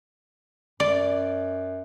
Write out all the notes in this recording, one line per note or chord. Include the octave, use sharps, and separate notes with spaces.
F#2 D5